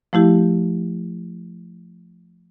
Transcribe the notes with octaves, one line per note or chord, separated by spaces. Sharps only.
F3 A3 E4 G4